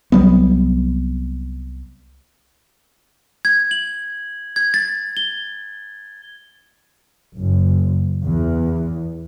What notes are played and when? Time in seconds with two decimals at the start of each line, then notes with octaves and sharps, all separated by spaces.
0.12 C2 F#3 G3 B3
3.45 G#6
3.71 F#7
4.56 G#6
4.74 A6
5.17 G7
7.38 F#1
8.25 E2